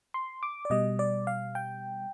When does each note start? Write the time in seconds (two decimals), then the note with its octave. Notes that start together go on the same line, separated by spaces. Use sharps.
0.14 C6
0.43 D6
0.65 D5
0.70 B2 G3 D#5
0.99 D5
1.27 F5
1.55 G5